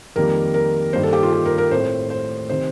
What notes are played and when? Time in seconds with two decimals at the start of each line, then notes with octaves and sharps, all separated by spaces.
0.16 F2 D#3 G3 A#3 A#4
0.54 A#4
0.93 G2 D#3 G3 A#3 C5
1.03 A4
1.13 G4
1.23 F4
1.33 G4
1.45 A#4
1.58 A#4
1.71 A2 A3 C4 C5
2.10 C5
2.49 C3 D#3 C5